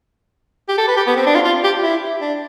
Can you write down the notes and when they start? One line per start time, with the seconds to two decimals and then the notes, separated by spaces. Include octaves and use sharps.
0.69 G4
0.78 A4
0.88 B4
0.97 G4
1.07 B3
1.16 C4
1.27 D4
1.35 F4
1.45 F4
1.64 G4
1.83 E4
2.21 D4